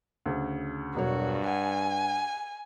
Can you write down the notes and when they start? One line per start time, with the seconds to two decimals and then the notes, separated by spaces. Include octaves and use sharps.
0.26 D2 C#3
0.96 E1 G2 F#3 F#4 C#5
1.46 F#5 G#5